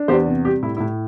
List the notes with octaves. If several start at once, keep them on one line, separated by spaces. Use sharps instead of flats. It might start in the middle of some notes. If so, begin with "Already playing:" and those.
Already playing: D4
E2 G4 C5
C3
G3 G4
A2 E4
E4
A2